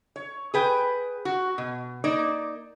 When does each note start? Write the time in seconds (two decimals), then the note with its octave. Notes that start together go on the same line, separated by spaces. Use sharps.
0.16 C#5
0.54 G#4 B4 G5
1.25 F#4
1.58 B2
2.04 A#3 D#4 D5